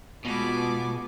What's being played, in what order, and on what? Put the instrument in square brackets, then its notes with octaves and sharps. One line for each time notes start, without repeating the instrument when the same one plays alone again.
[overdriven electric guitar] B2 [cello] G#3 F4 [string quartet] B3 G#5 D6